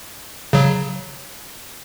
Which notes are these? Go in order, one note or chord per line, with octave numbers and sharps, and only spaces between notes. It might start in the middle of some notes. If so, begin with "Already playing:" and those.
C#3 F#3